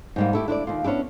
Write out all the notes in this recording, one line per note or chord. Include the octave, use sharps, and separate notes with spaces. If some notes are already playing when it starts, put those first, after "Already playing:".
G#2 G3 A#3
A3 E4 G4
D4 E4 B4 D5
D#2 F4
B3 C#4 D4 E4 G4